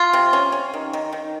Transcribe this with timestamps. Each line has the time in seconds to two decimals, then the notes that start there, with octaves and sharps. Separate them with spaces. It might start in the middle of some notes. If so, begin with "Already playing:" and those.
Already playing: F4
0.13 C3
0.33 C#4
0.52 C#4
0.73 D#3
0.93 D#3
1.13 D#3